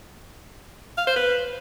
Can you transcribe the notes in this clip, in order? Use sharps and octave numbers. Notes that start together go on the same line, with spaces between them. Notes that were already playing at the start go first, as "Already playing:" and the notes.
F5
C5
B4